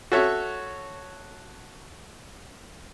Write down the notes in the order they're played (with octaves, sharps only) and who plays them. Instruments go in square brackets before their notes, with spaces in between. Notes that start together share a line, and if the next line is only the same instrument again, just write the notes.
[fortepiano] F#4 A4 C#5 E5